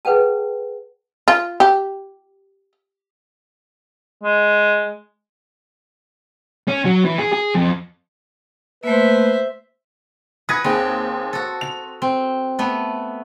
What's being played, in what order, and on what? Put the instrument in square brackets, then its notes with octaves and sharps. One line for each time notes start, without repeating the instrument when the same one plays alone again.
[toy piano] G#4 B4 F#5 G5 A5
[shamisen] F4
G4
[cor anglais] G#3
[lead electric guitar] C#4
F#3
E3
G#4
G#4
F2
[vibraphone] A3 A#3 [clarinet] B4 [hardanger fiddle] C5 E5
[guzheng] B4 F#5 [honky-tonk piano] D#6 G#6 A#6
[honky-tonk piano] D#2 G#4 [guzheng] C4
[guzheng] F#4 A4
[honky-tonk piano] F7
[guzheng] C4
A3 B3